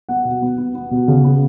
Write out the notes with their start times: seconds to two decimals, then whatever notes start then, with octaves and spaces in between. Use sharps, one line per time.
0.09 B3 F#5
0.25 B2
0.42 B3
0.58 B3
0.75 B3
0.91 B2
1.08 C#3
1.24 B3